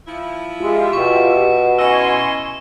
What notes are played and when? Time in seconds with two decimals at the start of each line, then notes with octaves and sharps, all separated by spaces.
0.06 F3 E4
0.60 G#3 F4 G4 E5
0.93 B2 C#6
1.79 C#4 E4 D#5 G#5 C6 C#6 E6